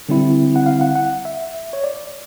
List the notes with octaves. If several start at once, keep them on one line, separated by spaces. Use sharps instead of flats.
D3 G3 C4 E4
F#5
F5
F#5
F#5
E5
C#5
D5